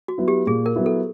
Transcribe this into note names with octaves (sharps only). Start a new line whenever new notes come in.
F#4
F#3 B3 E4
G4
A#2 G#4
A#4
F#3 B3 E4
A4